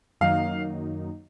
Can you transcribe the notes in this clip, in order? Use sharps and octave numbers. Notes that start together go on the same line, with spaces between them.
F#2 D#3 F#3 A#3 D#4 F5